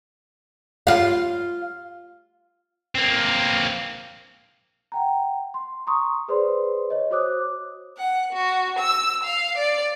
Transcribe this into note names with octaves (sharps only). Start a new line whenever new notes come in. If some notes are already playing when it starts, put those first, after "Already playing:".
F4 F5
A#3 C4
F#5 G5 A#5
C6
A#5 C6 C#6 D#6
G#4 B4 C5 D5 C6
C#5 D#5
F#4 C5 C#5 D6 D#6 F#6
F#5
F#4
E6
F5
D5